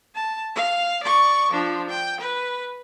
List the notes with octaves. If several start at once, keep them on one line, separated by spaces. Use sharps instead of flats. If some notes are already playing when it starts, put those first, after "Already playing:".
A5
F5
D5 C#6
F3 D4
G5
B4